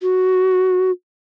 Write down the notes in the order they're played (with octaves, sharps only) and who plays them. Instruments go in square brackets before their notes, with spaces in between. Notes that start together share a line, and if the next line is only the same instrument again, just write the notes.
[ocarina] F#4